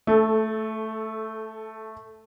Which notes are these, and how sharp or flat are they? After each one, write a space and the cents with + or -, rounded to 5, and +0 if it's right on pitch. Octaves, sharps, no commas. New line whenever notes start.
A3 +0 A4 -20